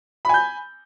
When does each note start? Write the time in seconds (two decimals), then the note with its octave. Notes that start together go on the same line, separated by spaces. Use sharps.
0.25 B5
0.29 G#5
0.34 G6